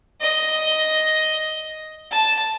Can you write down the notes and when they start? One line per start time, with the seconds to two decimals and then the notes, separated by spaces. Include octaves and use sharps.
0.21 D#5
2.12 A5